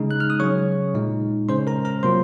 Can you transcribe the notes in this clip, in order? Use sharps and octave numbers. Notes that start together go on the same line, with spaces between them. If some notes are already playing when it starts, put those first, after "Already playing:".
Already playing: C#3 G#3 D#4
F#6
F6
D#6
C#3 F#3 C#4 C#5 C#6
A#2 G#3 D#4
C#3 G#3 C#4 C5 C6
A#4 A#5
A#4 A#5
C3 F#3 A#3 F4 C5 C6